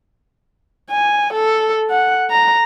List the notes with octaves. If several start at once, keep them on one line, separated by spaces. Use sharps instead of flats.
G#5
A4
F#5
A#5